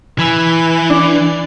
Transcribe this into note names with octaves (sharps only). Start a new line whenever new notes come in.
E3 G#5 B5 E6
D4